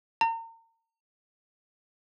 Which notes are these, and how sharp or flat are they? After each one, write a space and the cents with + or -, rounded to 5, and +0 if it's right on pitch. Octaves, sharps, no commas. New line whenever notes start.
A#5 -40